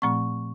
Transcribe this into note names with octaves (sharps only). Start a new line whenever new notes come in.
A#2 F3 A3 C4 C#6